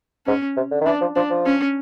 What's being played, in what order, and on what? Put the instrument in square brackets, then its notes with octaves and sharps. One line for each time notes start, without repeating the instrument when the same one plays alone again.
[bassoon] G#2 [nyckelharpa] C#4
[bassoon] C3
D3
D#3
[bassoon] E3 [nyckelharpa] D4
[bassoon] F3
[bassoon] F3 [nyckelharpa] D4
[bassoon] F3
[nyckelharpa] C#4